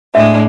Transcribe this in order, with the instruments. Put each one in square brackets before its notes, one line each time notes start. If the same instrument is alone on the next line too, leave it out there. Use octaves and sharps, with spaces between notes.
[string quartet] A2 G#3 D4 [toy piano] E5